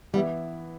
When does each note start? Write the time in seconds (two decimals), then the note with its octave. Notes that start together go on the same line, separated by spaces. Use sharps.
0.13 E3 G3 B3 E4